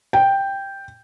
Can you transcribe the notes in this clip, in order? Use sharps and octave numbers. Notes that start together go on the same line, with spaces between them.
G5